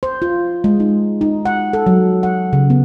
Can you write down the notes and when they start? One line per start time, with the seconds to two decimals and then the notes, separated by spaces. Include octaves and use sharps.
0.03 C5
0.22 F4
0.64 G#3
0.80 D#4
1.21 D#4
1.45 F#5
1.73 A4
1.86 F#3
2.23 F#5
2.53 C#3
2.70 B3